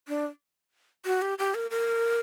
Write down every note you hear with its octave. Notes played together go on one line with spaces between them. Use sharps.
D4
F#4
G4
G4
A#4
A#4